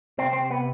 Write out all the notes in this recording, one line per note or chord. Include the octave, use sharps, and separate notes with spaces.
C3 C4
C4
B3